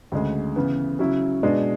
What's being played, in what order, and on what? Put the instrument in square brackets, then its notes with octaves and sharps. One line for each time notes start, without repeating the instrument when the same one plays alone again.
[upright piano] D2 C#3 G#3
C#3 E3 B3
C#3 F#3 C#4 E4
B2 G#3 D4